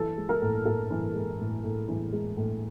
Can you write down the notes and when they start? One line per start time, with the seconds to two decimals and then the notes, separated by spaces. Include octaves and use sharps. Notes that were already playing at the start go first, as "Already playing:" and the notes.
Already playing: E3 A4
0.17 G#3
0.29 A#4
0.41 A2
0.65 A2 A4
0.90 E3
1.14 G#3
1.40 A2
1.64 A2
1.88 E3
2.13 G#3
2.37 A2